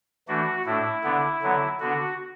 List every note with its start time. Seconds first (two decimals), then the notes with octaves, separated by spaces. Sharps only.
0.28 E3 A3 D4 F#4
0.66 A2 A3 D4 E4
1.04 D3 B3 D4
1.42 D3 F#3 B3
1.80 D3 B3 D4 F#4